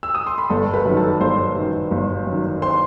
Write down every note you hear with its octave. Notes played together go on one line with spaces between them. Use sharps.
E6
D#6
C6
B5
G1 A4 A5
B4 B5
F#2 D#3
A4 A5
G1 C5 C6
F#2 D#3
G1
F#2 D#3
C5 C6